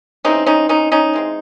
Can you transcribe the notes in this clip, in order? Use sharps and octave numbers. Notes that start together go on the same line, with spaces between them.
E3 G#3 C4 C#4 D#4
C#4 D#4
C#4 D#4
C#4 D#4
E3 G#3 C4